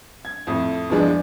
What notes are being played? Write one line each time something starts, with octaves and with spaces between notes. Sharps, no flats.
G#6
F2 A2
E2 G2 F3 G#3 D4